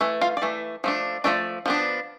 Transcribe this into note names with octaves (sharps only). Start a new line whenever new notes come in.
E3 A3
F4 F5
D5
E3 A3
F3 A3 D4
F3 A3 D4 D5
F3 B3 D4